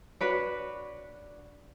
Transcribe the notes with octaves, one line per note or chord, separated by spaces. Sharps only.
D4 F#4 B4 C#5